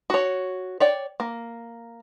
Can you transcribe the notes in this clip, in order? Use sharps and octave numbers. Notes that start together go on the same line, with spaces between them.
F#4 C#5
C#5 D5 G5
A#3